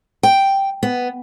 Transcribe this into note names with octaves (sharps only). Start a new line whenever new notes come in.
G5
B3